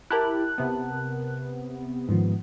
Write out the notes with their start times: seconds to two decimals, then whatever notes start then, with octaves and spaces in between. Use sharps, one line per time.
0.10 E4 G4 A#4 A5 F#6
0.58 C3 B3
2.09 G#2 D#3 F3